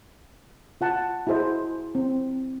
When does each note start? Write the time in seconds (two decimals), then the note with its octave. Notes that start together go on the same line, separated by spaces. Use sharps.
0.81 F4 F#5 A5
1.27 E4 F#4 G#4 C5 D#5
1.95 C4